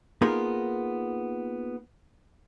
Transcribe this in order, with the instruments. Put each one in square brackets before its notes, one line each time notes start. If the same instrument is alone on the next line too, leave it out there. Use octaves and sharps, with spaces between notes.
[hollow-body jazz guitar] A#3 B3 D#4 F4 G#4 A#4